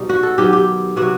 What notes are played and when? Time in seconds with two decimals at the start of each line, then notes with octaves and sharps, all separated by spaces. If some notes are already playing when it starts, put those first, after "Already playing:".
Already playing: B2 G3 D#4
0.09 F#4
0.23 A4
0.38 D#3 F#3 B3 G4
0.53 G4
0.96 C3 F#3 B3 F#4